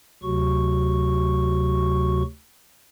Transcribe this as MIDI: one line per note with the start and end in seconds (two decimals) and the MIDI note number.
0.23 2.22 38
0.23 2.22 48
0.23 2.22 54
0.23 2.22 66
0.23 2.22 85